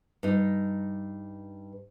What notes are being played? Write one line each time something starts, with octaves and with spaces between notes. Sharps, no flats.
G2 D#4